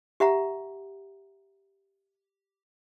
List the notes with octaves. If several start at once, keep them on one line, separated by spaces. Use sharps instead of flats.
G4 E5 F#5 A#5